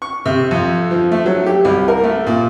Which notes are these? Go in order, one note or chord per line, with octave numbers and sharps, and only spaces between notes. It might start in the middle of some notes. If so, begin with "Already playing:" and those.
C#6
C3
F2
F3
A3
F#3
G4
C2
A#4
A3
A#2